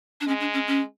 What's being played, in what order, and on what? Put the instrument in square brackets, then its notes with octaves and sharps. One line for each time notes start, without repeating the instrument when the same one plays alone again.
[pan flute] D4
[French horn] G#3 [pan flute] C#4
[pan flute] D4
C#4
C#4